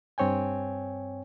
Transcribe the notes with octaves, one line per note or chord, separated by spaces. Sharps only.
G2 C4 C#5 G5 G#5